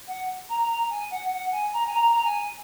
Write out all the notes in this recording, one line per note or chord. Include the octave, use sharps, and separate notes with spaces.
F#5
A#5
A#5
G#5
F#5
F#5
G#5
A#5
G#5
A#5
A#5
G#5